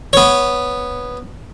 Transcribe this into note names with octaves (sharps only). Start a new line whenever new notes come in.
B3 C#5